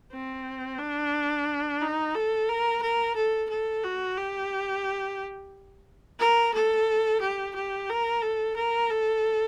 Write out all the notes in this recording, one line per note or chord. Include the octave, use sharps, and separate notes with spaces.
C4
D4
D#4
A4
A#4
A#4
A4
A4
F#4
G4
A#4
A4
G4
G4
A#4
A4
A#4
A4